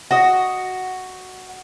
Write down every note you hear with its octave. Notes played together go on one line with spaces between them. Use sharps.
F#4 D#5